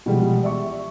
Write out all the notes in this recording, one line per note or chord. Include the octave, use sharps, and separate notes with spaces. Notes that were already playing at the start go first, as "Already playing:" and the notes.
B2 E3 F3 G3 G#3
D5 E5 C#6